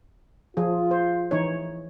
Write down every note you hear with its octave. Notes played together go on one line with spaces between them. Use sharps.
F3 F4 G#4
C5
E3 D#4 C#5